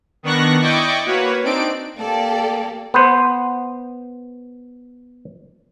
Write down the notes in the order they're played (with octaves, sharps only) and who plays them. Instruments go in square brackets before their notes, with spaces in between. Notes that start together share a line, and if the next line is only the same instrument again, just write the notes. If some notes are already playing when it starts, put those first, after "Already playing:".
[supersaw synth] D#3 B3 D4 C#6 F#6 A#6
E4 D5 D#5 G5 C#6 D6
A#3 F#4 B4 C#5
C4 D4 D#4 D5 D7
[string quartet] A#3 G4 [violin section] A4 D5
[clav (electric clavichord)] B3 B4 C5